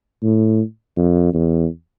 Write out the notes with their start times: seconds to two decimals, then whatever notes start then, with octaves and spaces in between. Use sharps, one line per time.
0.23 A2
0.97 F2
1.34 E2